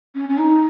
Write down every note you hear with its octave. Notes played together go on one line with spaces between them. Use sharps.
C#4
C#4
D#4